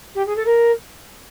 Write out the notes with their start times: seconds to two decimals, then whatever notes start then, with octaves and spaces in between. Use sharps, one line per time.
0.15 G4
0.26 G#4
0.36 A4
0.45 A#4